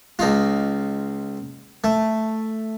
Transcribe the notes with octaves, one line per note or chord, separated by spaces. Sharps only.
C#2 D#4 F4
A3